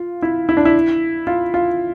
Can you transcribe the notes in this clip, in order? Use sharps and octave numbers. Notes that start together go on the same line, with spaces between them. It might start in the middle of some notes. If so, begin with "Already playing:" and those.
Already playing: F4
E4
E4
D4
E4
F4
F4